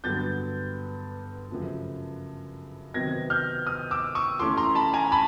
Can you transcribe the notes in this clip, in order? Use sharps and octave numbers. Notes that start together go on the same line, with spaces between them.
G2 D3 F#3 B3 G6 A6
F#2 C#3 F3 A3
C3 D#3 F#3 B3 G#6 A#6
F6 G6
D#6 F6
D6 E6
C#6 D#6
E3 A3 C#4 E4 C6 D6
A#5 C6
A5 B5
G#5 A#5
A5 B5